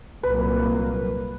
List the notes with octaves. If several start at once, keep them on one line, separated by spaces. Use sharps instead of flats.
C2 A#2 F#3 A#3 B4